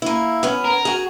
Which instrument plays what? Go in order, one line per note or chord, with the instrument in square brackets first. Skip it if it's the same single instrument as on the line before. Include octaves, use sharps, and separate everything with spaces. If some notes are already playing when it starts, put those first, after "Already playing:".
[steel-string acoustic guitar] A#3 E4
B3 C#4
[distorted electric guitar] A#4
[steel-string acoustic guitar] F#4 G#4